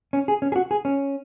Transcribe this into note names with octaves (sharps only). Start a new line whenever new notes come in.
C#4
G#4
C#4
G#4
F#4
G#4
C#4